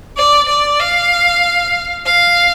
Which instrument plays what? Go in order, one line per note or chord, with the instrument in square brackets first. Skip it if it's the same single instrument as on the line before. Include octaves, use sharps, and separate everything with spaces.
[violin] D5
D5
F5
F5